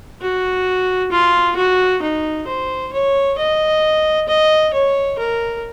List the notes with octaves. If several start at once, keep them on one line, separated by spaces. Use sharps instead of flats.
F#4
F4
F#4
D#4
C5
C#5
D#5
D#5
C#5
A#4